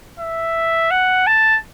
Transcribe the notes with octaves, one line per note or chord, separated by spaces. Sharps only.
E5
F#5
A5